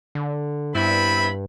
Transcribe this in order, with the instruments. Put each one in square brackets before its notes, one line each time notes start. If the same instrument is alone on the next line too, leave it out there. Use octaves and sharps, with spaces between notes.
[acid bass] D3
[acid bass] G2 [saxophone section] B3 C4 E4 [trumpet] B5